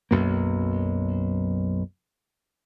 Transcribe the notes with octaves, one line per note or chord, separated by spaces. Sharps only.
B1 F#2 A#3